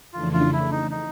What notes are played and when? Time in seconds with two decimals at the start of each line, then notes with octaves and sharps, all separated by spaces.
0.13 F2 C#3 E3 A3 D4 F4
0.33 F4
0.53 E4
0.72 D#4
0.91 D#4